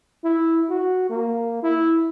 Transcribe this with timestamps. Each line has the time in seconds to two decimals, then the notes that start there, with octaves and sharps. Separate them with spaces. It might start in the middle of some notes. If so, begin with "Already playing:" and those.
0.24 E4
0.69 F#4
1.10 A#3
1.63 E4